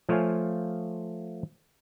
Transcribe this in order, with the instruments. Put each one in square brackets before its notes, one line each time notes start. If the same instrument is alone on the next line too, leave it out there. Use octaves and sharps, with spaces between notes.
[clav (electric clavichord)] F3 A3 F4 C#5 F5 G#5